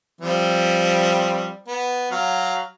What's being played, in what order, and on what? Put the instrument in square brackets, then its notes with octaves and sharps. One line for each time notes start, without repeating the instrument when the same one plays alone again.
[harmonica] F3 G3 C4
B3
F#3 F5